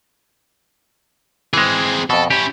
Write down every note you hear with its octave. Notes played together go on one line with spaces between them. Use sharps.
E3 G#3 C4 G#4
F2 B2 A4
C#4 E4 G4